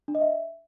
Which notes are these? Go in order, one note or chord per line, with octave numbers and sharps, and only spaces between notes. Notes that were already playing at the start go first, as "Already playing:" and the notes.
D4
D#5
E5